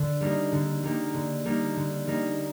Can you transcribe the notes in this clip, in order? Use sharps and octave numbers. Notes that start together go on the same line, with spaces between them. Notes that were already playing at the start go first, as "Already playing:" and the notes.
Already playing: D3
G3 A#3 D#4
D3
G3 A#3 D#4
D3
G3 A#3 D#4
D3
G3 A#3 D#4